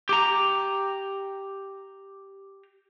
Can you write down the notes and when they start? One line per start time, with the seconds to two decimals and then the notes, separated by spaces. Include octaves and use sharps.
0.09 G4 A#5